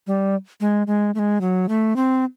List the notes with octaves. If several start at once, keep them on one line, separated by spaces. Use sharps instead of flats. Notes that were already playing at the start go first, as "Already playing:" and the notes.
G3
G#3
G#3
A3
G#3
F#3
A3
C4